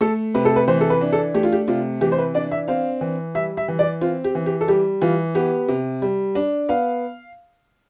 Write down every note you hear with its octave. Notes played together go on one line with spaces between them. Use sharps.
A3 A4
C3 B4
A4
B4
E3 C5
A4
B4
D4
A4
A3 G4
F4
G4
C3 F4
E3 G4
C5
B4
D4 D5
E5
C4 F5
E3
G3 E5
E5
E3
D5
C4 F4
G4
E3
G4
A4
G3 G4
E3 F4
B3 G4
C3
G3
D4
B3 F5